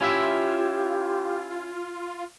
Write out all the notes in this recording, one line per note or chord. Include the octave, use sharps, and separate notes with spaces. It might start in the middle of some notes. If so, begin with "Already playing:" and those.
C#4 E4 F4 G4 E5